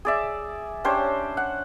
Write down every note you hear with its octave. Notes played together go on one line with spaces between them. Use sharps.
G#4 D5 E5
C#4 D4 G4 C5
F#5